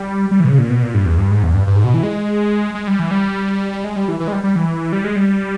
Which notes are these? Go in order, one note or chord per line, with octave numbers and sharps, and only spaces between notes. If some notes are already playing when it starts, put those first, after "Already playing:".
Already playing: G3
G3
E3
B2
C#3
A#2
B2
A#2
G2
E2
G2
G#2
E2
G2
G2
G#2
B2
E3
G#3
G#3
G3
E3
G3
G#3
G3
E3
E3
G#3
G3
G3
E3
G3
G#3
G3